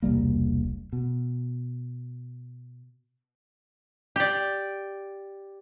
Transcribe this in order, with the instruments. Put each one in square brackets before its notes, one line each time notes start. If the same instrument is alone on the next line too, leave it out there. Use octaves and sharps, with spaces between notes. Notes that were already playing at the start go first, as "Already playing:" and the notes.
[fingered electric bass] E1 C2 G3 A#3
B2
[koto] G4 D5